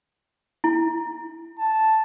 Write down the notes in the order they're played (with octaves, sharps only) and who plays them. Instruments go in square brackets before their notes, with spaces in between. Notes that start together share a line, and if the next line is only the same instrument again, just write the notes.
[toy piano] E4
[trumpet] A5